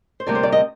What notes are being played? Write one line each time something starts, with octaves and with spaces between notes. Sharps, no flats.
C5
D2 C3 G3 A#3 D5
C5
D5
D#5